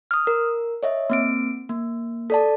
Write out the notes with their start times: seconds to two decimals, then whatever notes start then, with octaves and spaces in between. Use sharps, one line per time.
0.11 D#6 F6
0.27 A#4
0.83 C#5 D#5 E5
1.10 A#3 C4 D7
1.69 A#3
2.30 A4 D5 A5